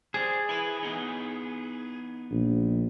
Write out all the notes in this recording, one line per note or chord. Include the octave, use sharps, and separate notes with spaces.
G#4 C5 D5
E4 B4
E3 B3 D#4
A#1